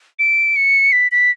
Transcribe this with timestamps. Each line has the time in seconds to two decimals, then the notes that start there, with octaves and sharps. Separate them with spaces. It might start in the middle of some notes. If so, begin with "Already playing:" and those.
0.19 D7
0.56 C#7
0.92 B6
1.12 B6